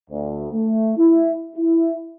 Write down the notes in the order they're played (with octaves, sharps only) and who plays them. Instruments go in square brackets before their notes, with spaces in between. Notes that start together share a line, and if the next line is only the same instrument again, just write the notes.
[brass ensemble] D2
A3
E4
E4